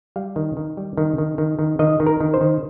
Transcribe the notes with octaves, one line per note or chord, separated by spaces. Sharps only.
G3 F5
D#3
D#3
G3
D#3
D#3
D#3
D#3
D#3 D#5
D#3
A#4
D#3
C5
D#3